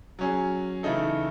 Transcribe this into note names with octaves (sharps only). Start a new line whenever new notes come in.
F#3 C#4 G#4
C#3 E3 A3 D#4 A4